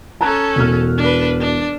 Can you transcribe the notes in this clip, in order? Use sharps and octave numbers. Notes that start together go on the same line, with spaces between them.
C#4 A4 A5 A#5 F#6
E1 B2 F6
D4 B4
D4